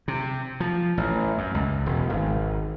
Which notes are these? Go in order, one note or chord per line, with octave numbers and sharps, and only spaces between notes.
C3
F3
A1
F#2
C#2
E1
G#1